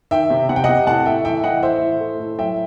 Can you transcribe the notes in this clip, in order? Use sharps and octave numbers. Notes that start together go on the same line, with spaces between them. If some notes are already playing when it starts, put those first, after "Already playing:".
D#3 E5 G5
C3
C3 F#5
G5
C3 D#5 F#5
A2 F#5 A5
A2 E5 G5
E3 E5 G5
E3 D#5 F#5
A2 C5 E5
A2
A3
A2
F#3 E5 G5